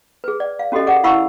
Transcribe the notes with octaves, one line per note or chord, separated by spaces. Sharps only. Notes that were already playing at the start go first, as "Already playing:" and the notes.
G#4 B4
D5
F5
C#4 F#4 G4 A4 D#5
G#4 A#4 D5 F#5
E4 F5 F#5 B5 C#6 E6